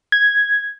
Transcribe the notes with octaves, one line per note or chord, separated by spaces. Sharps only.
G#6